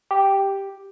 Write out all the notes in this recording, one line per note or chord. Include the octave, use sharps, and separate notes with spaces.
G4